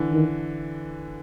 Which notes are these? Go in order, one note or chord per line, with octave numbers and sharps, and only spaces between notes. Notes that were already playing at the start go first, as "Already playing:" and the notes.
Already playing: D3 E3
D#3